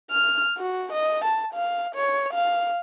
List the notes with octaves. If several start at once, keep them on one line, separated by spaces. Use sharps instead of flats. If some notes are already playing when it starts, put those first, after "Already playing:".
F6
F#4
D#5
A5
F5
C#5
F5